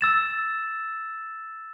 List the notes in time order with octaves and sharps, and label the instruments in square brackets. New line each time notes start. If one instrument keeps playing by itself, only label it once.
[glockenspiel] E6 A6 E7